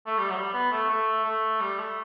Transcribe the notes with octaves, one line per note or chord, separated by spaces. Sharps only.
A3
G3
F#3
G3
B3
A3
A3
A3
G3
A3